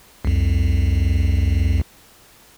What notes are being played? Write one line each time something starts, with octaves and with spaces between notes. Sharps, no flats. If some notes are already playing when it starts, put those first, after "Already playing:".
C2 F2